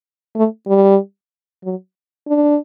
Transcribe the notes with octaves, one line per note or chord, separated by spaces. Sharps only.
A3
G3
F#3
D4